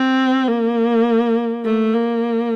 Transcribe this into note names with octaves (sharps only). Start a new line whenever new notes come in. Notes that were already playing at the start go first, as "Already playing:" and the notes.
Already playing: C4
A#3
A3
A#3